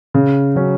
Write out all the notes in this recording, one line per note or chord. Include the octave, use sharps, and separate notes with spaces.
C#3
F#3 C#4